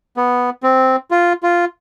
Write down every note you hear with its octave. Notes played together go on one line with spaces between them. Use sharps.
B3
C4
F4
F4